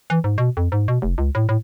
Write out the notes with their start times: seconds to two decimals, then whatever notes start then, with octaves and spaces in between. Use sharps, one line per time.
0.10 E3
0.24 G#2
0.38 B2
0.57 F2
0.72 G#2
0.88 B2
1.02 F1
1.18 C#2
1.35 A2
1.49 A2